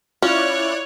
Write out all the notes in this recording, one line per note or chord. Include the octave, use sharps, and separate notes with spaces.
C#4 E4 F4 C#5 D5 F#6